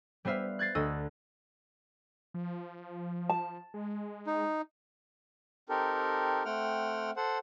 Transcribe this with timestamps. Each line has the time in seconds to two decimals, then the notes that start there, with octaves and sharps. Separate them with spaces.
0.25 G3 B3 C5 E5 F5
0.59 F#6 G#6 A6 C7
0.75 D2 D#5 E6
2.34 F3
3.29 A5
3.74 G#3
4.26 D#4
5.69 C4 D#4 G4 A4 A#4
6.45 A3 C4 F#5 G5 F6
7.17 A4 C5 F#5